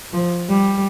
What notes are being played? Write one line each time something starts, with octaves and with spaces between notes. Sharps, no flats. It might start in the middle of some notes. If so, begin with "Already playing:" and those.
F3
G3